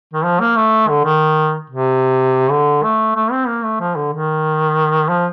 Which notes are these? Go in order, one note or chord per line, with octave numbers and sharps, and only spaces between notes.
D#3
F3
A#3
A3
D3
D#3
C3
D3
A3
A3
C4
A#3
A3
F3
D3
D#3
F3